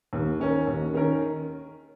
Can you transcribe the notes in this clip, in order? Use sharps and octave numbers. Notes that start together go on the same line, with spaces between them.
D#2
D#3 C#4 A#4
D#2
D#3 C#4 A#4